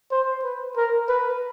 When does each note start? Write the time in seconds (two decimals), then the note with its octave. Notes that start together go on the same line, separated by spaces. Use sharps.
0.12 C5
0.44 B4
0.77 A#4
1.09 B4